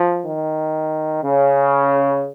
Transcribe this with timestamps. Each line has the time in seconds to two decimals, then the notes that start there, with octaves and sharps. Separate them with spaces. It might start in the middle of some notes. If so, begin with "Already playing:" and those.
Already playing: F3
0.26 D#3
1.24 C#3